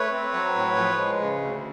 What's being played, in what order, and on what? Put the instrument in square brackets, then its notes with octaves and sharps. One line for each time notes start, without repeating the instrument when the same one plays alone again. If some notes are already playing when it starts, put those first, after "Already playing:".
Already playing: [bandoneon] A3 B4 C#5
C4
F#3
A2
F3
G#3
C#3
D2